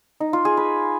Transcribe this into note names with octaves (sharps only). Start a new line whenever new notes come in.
D#4
F4
G#4
B4